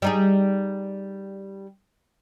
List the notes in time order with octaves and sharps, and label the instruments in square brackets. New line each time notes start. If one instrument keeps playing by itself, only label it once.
[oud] G3 D#4 G#4